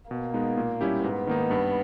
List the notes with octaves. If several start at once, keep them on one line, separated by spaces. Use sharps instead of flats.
B2 A#3
G#3 B3 D#4
A#2
G3 C#4 E4 G4
G#2 B3
D#3 A#3 D#4
G2